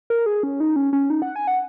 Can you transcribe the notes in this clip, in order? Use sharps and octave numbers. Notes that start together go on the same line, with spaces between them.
A#4
G#4
C#4
D#4
C#4
C#4
D#4
F#5
G#5
F#5